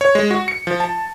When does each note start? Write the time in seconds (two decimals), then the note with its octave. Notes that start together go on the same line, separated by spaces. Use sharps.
0.01 C#5
0.15 G#3
0.31 F#4
0.48 C#7
0.67 F3
0.80 A5